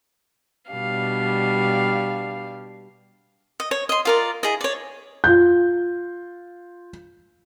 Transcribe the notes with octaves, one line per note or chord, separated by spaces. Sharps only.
B2 G3 D4 F5
D#5
C#5
D#5 C6
F4 A#4 D5
E4 G#4 D#5
C#5 D5
F4 G6